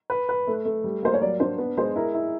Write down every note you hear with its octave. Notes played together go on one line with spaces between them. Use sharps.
B4
B4
A3
A3
G3
A#3 C5
C#5
F#3 D5
D4 C5
B3 B4
G#3 C5
E4 A#4
E4